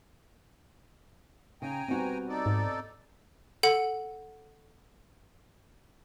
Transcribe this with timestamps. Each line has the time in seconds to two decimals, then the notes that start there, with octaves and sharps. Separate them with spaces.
1.62 C#3 G5 G#5 A#5
1.88 G3 B3 C4 F#4
2.29 D#4 A4 D5
2.46 G#2
3.63 A4 F#5